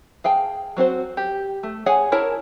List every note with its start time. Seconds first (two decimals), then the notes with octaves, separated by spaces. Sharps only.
0.24 G#4 F5 G5 A5
0.77 F#3 C4 F#4 C5
1.17 G4
1.63 A3
1.86 G#4 C#5 F#5 G#5
2.12 E4 A#4 C#5 A5 A#5